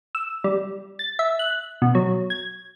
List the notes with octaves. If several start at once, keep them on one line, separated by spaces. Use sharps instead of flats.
E6
G3
A6
E5
F#6
B2
F#3
G#6